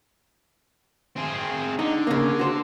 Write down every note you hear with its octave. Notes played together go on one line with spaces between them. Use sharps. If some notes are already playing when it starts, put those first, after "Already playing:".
C4 G#4
D3 D#4
C#3 A#3
F#4 C5